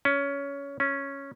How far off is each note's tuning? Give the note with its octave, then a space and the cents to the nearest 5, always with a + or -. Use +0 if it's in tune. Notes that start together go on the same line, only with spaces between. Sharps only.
C#4 +15
C#4 -5